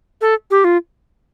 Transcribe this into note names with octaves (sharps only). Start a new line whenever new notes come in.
A4
G4
F4